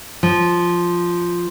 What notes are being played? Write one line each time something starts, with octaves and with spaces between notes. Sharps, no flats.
F3